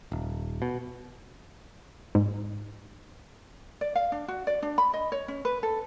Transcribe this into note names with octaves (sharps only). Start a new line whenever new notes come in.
D#1
B2
G#2
D5
F5
D4
F#4
D5
D4
B5
D#5
C#5
C#4
B4
A4